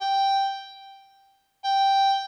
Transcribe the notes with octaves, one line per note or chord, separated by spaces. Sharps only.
G5
G5